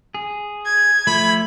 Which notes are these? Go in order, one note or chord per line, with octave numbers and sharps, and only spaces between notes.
G#4
G#6
F3 A3 B5